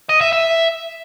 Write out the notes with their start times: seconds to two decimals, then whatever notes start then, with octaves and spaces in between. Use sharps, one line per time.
0.09 D#5
0.21 E5
0.33 E5